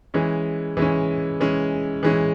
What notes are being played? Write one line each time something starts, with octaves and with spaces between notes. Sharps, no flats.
E3 G#3 C#4
E3 G#3 C#4
E3 G#3 C#4
E3 G#3 C#4